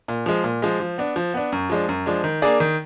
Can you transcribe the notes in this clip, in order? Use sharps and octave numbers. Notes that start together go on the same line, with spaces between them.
A#2
F3 G#3
A#2
F3 G#3
F3
B3 D4
F3
B3 D4
F#2
F3 G#3 D4
F#2
F3 G#3 D4
D#3
A#3 D4 G#4 D5
D#3